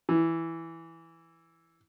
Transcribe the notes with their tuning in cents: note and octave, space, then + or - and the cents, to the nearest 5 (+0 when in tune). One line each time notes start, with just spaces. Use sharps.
E3 +0